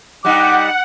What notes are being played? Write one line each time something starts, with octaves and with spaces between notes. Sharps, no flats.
G3 D#4 F#5 D6